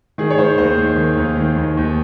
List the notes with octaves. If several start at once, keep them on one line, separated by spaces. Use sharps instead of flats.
D#3 G#4
C#5
D#3 C5
D#2 C5
D#3
D#3
D#2
D#3
D#2
D#2